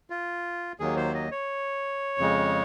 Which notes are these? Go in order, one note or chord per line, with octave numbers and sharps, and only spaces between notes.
F4
D#2 D#3 F#3 A#3 G#4
C5
D#5
C#5
F2 C#3 G#3